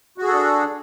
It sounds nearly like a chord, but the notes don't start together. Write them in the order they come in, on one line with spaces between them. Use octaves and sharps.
F#4 G#4 A4 D4